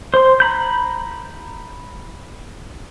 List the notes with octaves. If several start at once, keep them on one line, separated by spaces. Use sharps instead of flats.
C5 C6
A#5 B5 G6